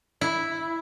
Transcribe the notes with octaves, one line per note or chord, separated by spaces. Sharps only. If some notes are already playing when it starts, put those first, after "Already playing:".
E4